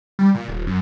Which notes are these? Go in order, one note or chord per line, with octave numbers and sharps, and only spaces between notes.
G3
A#2
D#1
F#2